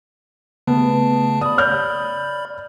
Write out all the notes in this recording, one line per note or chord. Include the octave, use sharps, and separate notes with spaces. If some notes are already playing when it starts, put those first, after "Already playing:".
C#3 A3 B3 A5
D5 B5 D#6
C#5 F6 G6